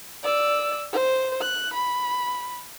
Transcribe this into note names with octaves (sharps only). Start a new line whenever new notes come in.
D5 E6
C5
F#6
B5